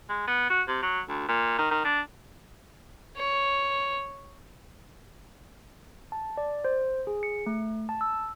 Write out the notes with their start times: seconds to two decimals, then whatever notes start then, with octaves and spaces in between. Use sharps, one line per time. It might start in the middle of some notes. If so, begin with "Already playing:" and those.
0.09 G#3
0.27 B3
0.50 F#4
0.68 C3
0.82 F#3
1.09 D2
1.28 A#2
1.58 D#3
1.71 D#3
1.84 D4
3.17 C#5
6.12 A5
6.37 D5
6.65 C5
7.07 G#4
7.23 C#7
7.46 A3
7.89 A5
8.01 E6